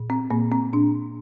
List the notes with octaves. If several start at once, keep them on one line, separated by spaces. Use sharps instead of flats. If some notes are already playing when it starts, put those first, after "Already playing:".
Already playing: A#2
C4
A#2 A#3
C4
A#2 D4